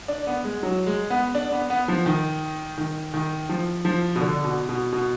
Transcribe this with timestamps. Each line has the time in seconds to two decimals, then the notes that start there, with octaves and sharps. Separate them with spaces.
0.08 D4
0.27 B3
0.44 G#3
0.63 F#3
0.86 G#3
1.10 B3
1.35 D4
1.52 B3
1.70 B3
1.88 F3
2.06 D#3
2.78 D#3
3.14 D#3
3.49 F3
3.85 F3
4.16 B2
4.21 D3
4.44 B2
4.69 B2
4.93 B2